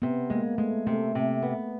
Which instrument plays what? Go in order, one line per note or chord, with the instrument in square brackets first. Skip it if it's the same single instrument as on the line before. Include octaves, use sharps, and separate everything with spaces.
[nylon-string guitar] C3 [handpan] B3
[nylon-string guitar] G#3 [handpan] A#3
[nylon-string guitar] G#3 [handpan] A3
[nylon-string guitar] C3 [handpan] A3
[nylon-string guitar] C3
B3